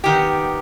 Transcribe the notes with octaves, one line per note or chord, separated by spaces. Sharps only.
D#3 B3 D#4 G4